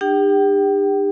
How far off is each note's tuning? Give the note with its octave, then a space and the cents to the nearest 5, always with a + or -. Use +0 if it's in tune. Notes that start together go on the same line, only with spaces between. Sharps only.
D4 +45 G4 +35 G5 -30